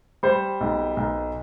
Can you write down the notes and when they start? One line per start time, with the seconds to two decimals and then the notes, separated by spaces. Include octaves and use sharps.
0.23 G3 C5
0.61 B1
0.97 B1